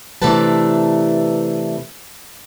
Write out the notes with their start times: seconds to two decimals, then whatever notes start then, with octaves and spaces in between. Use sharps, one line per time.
0.22 C3 E3 A3 D4 B4 A5